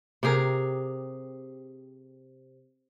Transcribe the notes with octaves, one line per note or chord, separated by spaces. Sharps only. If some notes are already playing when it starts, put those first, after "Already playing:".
C3 G4 G#4 A#4